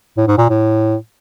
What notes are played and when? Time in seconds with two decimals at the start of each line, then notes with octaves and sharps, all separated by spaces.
0.17 A2
0.27 G#2
0.38 A#2
0.50 A2